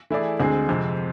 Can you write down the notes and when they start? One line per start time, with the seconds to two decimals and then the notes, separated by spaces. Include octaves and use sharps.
0.10 E3 A3 E4 G#4 D5
0.40 D2 D3 G#3 C4 G#4
0.69 F2 C3 G#3 C4